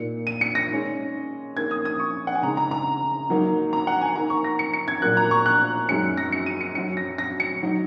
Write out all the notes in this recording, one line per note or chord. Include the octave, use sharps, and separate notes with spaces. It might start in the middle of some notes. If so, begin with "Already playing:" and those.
Already playing: A#2 A#3 D#4 C#7
D#7
C#7
A#6
D#3 G#3 C#4
D#3 A#3 C#4 G#6
D#6
D#6
C#6
F#5
G#5
C#3 G#3 D#4 A#5
A#5
A#5
G#2 F#3 A#3 D#4
A#5
F#5
G#5
D#3 A#3 D#4 A#5
C#6
A#6
C#7
C#7
G#6
A#2 F#3 A#3 F#6
A#5
C#6
F#6
F#2 D#3 G#3 C#4 C#7
A#6
C#7
D#7
C#7
F#2 F#3 C#4 C#7
A#6
A#6
C#7
D#3 F#3 D#4